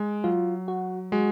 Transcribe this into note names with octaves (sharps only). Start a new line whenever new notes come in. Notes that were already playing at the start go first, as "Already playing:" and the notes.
Already playing: G#3
F#3 F4
F#4
G#3 F#4